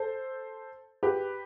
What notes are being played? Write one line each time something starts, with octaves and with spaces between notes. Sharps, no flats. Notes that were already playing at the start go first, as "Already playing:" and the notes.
Already playing: A4 C5
G4 B4